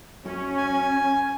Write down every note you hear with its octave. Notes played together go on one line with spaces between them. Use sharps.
F#2 C#4
G#5